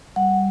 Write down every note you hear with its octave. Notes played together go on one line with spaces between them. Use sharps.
G3 F#5